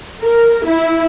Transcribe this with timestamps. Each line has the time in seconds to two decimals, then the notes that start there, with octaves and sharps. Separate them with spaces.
0.22 A#4
0.66 E4